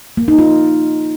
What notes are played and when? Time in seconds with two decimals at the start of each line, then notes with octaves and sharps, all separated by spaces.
0.17 A#3
0.28 D#4
0.39 F4